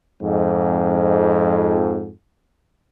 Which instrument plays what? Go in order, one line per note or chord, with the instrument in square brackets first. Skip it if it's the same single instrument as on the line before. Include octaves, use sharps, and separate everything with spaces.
[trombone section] F2 G#2